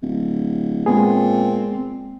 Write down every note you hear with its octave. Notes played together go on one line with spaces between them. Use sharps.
D1
A#2 G#3 B3 C4 G#4